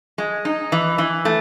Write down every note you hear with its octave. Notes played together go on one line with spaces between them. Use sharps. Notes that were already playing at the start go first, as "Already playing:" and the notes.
G#3
D#4
E3
E3
A3